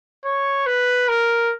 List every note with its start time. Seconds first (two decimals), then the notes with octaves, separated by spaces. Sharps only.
0.24 C#5
0.66 B4
1.08 A#4